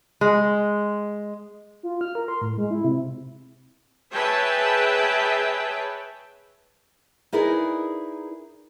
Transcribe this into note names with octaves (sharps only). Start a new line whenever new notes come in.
G#3
F4
F6
A#4
C6
A2
G#3
E4
C3
G#4 B4 C#5 E5 G5 A5
D#4 E4 G#4 A#4 B4 D5